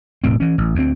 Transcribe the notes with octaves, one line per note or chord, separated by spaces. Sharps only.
E1 A2 C4
E3 C#4
A1
D2 C4